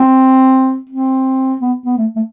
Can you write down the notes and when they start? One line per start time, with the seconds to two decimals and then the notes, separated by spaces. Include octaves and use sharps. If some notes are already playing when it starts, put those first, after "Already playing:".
Already playing: C4
0.89 C4
1.61 B3
1.85 B3
1.98 A3
2.16 A3